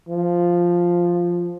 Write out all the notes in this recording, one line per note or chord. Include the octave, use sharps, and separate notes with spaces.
F3